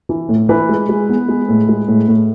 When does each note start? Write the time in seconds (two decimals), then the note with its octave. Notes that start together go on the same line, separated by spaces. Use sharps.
0.09 E3
0.29 A2
0.49 E3 B4
0.69 G#3
0.89 G#3
1.09 B3
1.28 G#3
1.49 A2
1.69 G#3
1.88 A2
2.08 A2